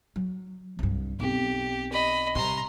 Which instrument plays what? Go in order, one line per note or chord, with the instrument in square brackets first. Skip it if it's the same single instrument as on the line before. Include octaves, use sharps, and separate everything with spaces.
[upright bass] F#3
C2 G2
[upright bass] B1 C4 [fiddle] G4
[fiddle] D#5 B5
[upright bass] C3 G3 [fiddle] A#5 C6